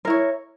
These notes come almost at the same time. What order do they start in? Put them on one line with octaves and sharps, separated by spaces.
A#4 E4 C#5